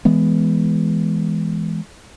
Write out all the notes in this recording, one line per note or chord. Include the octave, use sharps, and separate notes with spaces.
E3 G#3 B3